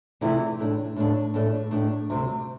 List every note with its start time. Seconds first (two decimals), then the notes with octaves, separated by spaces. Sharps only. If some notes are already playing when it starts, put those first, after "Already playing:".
0.21 E2 C3 E3 A3 E4
0.58 A2 A3 D4
0.96 A2 A3 D4
1.34 A2 A3 D4
1.71 A2 A3 D4
2.10 D2 C3 G3